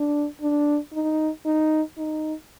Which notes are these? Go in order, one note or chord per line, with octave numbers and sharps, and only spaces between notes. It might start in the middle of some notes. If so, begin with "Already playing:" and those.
Already playing: D4
D4
D#4
D#4
D#4